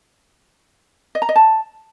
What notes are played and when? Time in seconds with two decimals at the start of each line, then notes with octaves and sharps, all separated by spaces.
1.15 D#5
1.22 A#5
1.29 D#5
1.36 A5